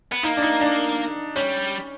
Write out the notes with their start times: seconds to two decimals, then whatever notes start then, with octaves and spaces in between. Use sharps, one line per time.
0.12 B3
0.23 A#3 D#4
0.37 D4
0.42 D#4
0.61 D4
1.36 G3 C#4